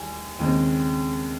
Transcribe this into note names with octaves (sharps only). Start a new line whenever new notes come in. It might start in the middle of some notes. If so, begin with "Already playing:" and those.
Already playing: D#2 G3 G#5
D#2 C#3 G#3 C4